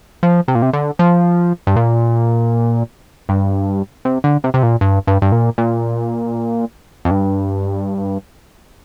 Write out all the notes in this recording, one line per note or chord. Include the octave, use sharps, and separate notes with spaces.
F3
C3
A#2
C3
D3
F3
G2
A#2
G2
C3
D3
C3
C3
A#2
G2
G2
G2
A#2
A#2
F2
G2